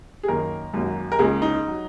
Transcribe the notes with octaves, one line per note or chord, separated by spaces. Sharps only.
G#4
F#2 D#3 A#3 A#4
G#1 F#2 F#3 A#3
A#4
C#2 C#3 A#3 G#4
D#4
F#3